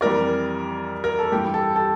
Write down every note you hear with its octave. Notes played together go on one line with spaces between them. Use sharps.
F2 E3 G3 A#4 D5
A#4
A4
G2 E3 G3 G4
A4
A4